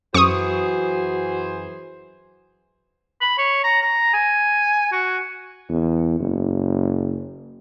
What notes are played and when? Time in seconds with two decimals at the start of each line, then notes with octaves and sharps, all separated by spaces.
0.14 F#2 E3 F#4 G#4 C5 C#6 D#6
3.21 B5
3.38 C#5
3.64 A#5
3.82 A#5
4.14 G#5
4.92 F#4
5.69 E2
6.19 F#1